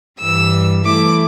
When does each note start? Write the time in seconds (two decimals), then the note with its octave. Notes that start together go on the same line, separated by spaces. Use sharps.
0.19 G2 E3 G3 E6
0.85 E3 A3 E4 D6